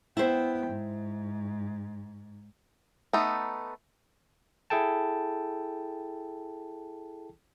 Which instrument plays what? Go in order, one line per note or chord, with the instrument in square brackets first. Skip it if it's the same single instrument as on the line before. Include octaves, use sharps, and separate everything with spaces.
[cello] B3 G5 [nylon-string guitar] E4 C5
[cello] G#2
[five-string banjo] A3 B3 D#4
[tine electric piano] E4 G#4 A4 G5 A5